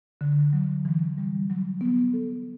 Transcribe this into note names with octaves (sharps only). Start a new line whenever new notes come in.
D3
F#3
E3
G3
F#3
B3
A4